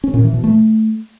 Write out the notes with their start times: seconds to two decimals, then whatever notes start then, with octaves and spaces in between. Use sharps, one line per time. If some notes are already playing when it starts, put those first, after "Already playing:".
0.04 C#4
0.14 A#2
0.24 E3
0.34 B2
0.44 A3